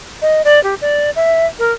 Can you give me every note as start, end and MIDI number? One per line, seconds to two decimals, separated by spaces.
0.22 0.42 75
0.45 0.62 74
0.64 0.75 67
0.82 1.11 74
1.16 1.46 76
1.59 1.72 70